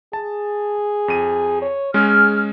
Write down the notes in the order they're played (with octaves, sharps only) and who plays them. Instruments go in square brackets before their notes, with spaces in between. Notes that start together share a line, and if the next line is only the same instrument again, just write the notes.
[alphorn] G#4 [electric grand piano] A5
[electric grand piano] F2 D#7
[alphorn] C#5
[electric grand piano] G#3 C#4 [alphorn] G#4 [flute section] F6